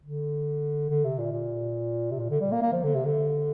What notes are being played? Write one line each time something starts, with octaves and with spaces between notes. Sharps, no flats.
D3
D3
C3
A#2
A#2
C3
A#2
D3
G3
A#3
A#3
F3
D3
C3
D3